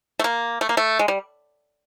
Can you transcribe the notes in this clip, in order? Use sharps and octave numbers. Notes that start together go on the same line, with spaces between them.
A3
A#3
A3
A#3
A3
G#3
G3